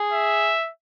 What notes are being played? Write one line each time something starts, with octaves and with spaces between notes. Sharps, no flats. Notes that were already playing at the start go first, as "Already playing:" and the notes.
Already playing: G#4
E5